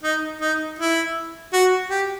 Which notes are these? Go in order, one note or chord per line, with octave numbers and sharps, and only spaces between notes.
D#4
D#4
E4
F#4
G4